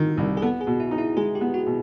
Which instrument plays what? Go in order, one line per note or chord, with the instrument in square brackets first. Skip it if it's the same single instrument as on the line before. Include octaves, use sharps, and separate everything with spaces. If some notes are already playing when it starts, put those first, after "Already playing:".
Already playing: [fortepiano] D#3 [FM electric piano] A#4
[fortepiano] C2
[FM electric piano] G#4
[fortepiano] B3 [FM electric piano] A4
[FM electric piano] G#4
[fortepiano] B2
[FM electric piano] E4
[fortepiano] D#4
[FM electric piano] E4
[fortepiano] G#3 [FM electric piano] G#4
[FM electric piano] G4
[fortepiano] B3
[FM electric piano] F#4
[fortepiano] B2